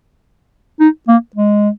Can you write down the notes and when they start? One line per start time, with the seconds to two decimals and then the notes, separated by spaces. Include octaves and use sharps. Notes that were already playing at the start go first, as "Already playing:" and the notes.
0.80 D#4
1.08 A#3
1.35 G#3